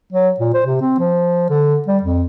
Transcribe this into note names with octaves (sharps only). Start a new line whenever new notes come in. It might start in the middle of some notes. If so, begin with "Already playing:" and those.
F#3
A#2
C5
C3
C4
F3
D3
G3
F2